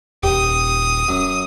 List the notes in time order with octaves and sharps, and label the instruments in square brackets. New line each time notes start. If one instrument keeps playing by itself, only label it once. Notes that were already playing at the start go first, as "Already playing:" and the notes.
[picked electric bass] D#1 [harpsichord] G4 [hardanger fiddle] D#6
[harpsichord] F#2